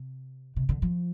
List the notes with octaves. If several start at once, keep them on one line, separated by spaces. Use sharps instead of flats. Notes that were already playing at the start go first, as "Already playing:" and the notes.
Already playing: C3
C3
D3
F3